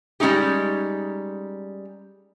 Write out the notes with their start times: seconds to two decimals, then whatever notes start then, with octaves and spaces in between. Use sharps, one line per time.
0.20 G3 G#3 C#4 D#4 G4